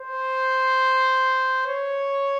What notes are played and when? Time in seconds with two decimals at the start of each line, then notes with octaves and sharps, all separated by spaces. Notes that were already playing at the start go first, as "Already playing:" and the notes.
Already playing: C5
1.67 C#5